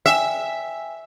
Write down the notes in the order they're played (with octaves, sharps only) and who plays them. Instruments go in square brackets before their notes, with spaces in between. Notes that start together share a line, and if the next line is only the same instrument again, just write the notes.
[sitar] E5 [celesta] G5 G#5